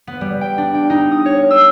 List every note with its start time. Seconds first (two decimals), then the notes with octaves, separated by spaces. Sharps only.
0.07 B3
0.21 G3
0.41 G5
0.58 D4
0.74 G5
0.90 D#4
1.12 D#6
1.25 C#5
1.51 E6